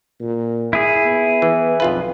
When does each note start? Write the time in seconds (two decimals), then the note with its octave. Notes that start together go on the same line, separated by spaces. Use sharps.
0.21 A#2
0.73 E4 G#4
1.06 B3
1.42 E3
1.80 B1 F2 F4 B4